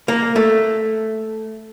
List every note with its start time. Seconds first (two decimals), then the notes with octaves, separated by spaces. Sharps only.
0.08 A#3
0.36 A3